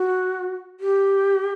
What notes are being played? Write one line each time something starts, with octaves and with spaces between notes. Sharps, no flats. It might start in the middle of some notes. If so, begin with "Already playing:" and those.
Already playing: F#4
G4